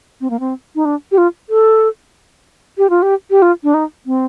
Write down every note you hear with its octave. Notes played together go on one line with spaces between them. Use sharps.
C4
A#3
C4
D#4
D4
G4
F4
A4
G4
F4
G4
G4
F4
D4
D#4
C4